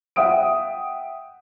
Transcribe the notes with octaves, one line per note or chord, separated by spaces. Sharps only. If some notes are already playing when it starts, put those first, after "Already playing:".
E5 F#5 G5 D#6 D7